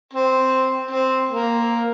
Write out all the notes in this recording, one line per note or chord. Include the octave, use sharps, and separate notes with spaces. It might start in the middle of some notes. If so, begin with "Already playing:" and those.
C4
C4
A#3